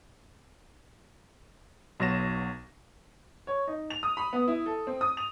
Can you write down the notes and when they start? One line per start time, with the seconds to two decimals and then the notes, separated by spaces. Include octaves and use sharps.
2.00 B1 F#3 A#6 E7
3.47 C#5
3.68 D#4
3.90 F7
4.03 D#6
4.17 B5
4.33 B3
4.48 E4
4.66 A4
4.87 C4
5.01 D#6
5.17 F7